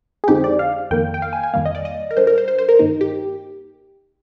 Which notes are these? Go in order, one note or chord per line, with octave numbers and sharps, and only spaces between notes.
G#4
F2 D3 G#3 C4 D#4 G4
D5
F5
F2 D#3 A#3 G5
G5
F5
G#5
G#5
F2 D#3 G3 A#3 F5
D#5
D5
D#5
A#4
A#2 G3 D4 C5
A#4
C5
C5
C5
A#4
G2 D#3 A#3 D#4
G4